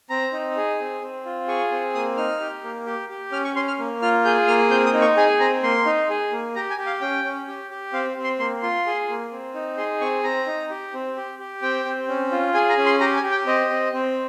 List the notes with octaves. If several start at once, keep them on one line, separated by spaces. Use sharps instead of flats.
C4 A#5
D#4
G#4
C4
C4
F4
G#4 C#6
C4
A#3 D#6
D#4 F6
G4
A#3
G4
G4
C#4 F6
C#6
C#4 C6
F6
A#3
F4 F6
G#4 G6
A#3 F6
C4 G6
D#6
D#4
C#6
G#4 G#5
C4 A#5
A#3 C6
D#4
G#4
A#3
G4 A#5
G#5
G4
F5
C#4 G5
C#4
G4
G4
C4 F5
C4
C6
A#3 C6
F4 C6
G#4
A#3
C4
D#4
G#4 C6
C4 C#6
C4 A#5
D#4
G4
C4
G4
G4
C4 G5
C4
C#4
F4
G#4 G#5
A#5
C#4
C6
G4 A#5
G#5
G4
G5
C4 D#5
C4
C4